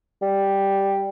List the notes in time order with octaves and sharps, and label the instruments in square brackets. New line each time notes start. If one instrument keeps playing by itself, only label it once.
[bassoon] G3